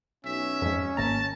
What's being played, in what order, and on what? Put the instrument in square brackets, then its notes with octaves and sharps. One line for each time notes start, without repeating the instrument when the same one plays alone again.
[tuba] B1 [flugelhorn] C#4 [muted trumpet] E5
[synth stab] F2 G#2
[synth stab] G#1 A#5 [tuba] A#3 [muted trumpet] A5